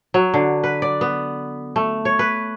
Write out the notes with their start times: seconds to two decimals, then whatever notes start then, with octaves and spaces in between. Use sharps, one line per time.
0.14 F#3
0.34 D3
0.64 B4
0.82 D5
1.01 B3
1.76 A3
2.05 C#5
2.19 B4